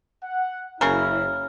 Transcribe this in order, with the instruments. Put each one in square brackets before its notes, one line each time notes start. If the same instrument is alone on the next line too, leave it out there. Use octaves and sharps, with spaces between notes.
[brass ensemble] F#5
[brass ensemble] F#1 E4 [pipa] C#3 A#4